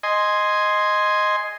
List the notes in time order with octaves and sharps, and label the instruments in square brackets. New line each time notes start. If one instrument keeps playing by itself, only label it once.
[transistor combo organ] D#5 G#5 C6